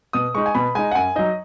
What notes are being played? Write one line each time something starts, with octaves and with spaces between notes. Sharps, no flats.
B2 D#6
G#3 D#4 C#6
G#5
B2 B5
G#3 D#4 G#5
F#5
F#2 G#5
F#3 D#4 D#5